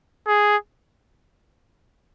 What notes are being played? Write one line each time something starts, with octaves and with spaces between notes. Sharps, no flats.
G#4